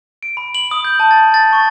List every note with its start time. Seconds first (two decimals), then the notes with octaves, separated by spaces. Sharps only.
0.23 D7
0.37 B5
0.55 F#7
0.71 D#6
0.85 G6
1.00 A5
1.11 A6
1.34 A6
1.53 C#6